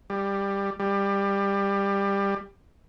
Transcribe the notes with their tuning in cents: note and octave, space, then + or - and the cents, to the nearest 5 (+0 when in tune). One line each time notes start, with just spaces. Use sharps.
G3 +15
G3 +20